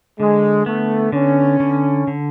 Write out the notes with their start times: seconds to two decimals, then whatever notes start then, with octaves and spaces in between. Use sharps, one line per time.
0.19 D3 G#3
0.66 A3 B3
1.12 D3 C#4
1.60 D3
2.07 D3